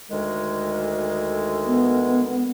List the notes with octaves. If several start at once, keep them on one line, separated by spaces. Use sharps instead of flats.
D2 D#3 G#3
B3